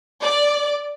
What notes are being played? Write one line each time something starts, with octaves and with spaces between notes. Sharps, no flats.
D5